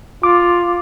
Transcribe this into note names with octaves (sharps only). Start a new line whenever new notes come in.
F4 D6